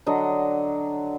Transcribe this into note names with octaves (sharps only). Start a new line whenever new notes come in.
D3 F#3 D#5